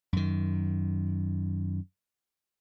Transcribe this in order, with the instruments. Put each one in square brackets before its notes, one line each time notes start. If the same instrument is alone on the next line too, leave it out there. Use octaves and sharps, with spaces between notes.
[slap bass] F#2 D#3